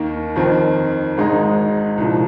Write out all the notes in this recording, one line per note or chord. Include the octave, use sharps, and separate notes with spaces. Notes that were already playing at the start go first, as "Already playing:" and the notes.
Already playing: D#2 D#3 A#3 D#4
F2 D#3 C4
G#1 G#2 G#3 D#4
C2 A#2 F3